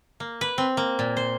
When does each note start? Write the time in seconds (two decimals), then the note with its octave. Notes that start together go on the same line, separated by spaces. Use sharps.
0.20 A#3
0.41 B4
0.58 C4
0.77 A#3
0.99 A#2
1.17 C5